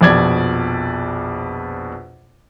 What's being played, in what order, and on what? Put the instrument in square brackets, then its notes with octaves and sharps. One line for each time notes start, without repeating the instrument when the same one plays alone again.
[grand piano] A#1 F2 B2 D5 G#6